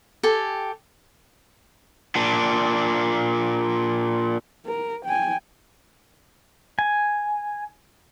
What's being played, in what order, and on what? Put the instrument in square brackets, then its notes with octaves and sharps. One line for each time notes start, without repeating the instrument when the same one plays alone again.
[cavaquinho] G4 A4 G#5
[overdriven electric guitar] A#2 D4
[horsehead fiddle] A#4
G5 G#5
[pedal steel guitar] G#5